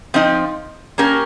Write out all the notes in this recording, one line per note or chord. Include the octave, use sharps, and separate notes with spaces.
F3 C4 D#4
A#3 C#4 G4 A#4